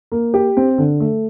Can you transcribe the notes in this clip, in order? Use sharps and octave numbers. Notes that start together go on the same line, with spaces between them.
A#3
G4
C4
D3
A3